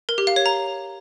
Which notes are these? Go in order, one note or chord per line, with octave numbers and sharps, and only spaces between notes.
A#4
G4
F5
C#5
A#5